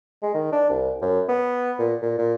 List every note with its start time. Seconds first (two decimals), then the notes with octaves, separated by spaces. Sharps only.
0.23 G#3
0.34 D#3
0.52 D4
0.70 C2
1.02 F#2
1.29 B3
1.79 A#2
2.02 A#2
2.18 A#2